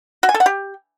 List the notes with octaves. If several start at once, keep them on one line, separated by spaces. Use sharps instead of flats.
F#4
G#5
A4
F#5
G4